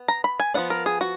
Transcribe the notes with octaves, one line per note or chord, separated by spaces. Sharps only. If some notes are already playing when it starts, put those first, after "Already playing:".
Already playing: B3
A#5
B5
G#5
F3 B3 D4 F#5
A#4
G#4
F#4